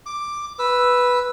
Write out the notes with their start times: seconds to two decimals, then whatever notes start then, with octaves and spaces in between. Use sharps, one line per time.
0.06 D6
0.59 B4 E6